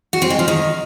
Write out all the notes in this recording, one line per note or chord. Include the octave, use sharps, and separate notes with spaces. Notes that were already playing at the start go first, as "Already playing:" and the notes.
F#4
C4
G#3
F3
D#3